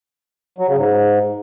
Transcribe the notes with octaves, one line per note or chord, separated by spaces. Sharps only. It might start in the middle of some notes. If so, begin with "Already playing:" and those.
F#3
C#3
G#2